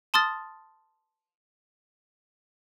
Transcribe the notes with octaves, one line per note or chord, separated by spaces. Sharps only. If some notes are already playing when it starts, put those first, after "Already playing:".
A5 C6 D#6 F6 A6